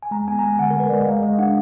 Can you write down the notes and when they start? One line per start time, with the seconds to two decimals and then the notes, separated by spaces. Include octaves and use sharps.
0.03 G#5
0.11 G#3 A#5
0.28 B3 G#5
0.39 A#5
0.43 G#3 G#5
0.59 D3 F#5
0.71 A#4
0.75 G#3 B4
0.89 G#3 D5
0.98 D#5
1.07 G#3 F5
1.23 G#3 D#5
1.38 D4 F#5